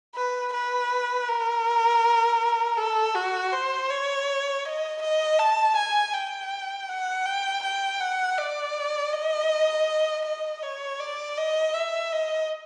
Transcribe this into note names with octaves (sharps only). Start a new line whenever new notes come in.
B4
B4
A#4
A4
F#4
C5
C#5
D#5
D#5
A5
G#5
G5
F#5
G5
G5
F#5
D5
D#5
D#5
C#5
D5
D#5
E5
D#5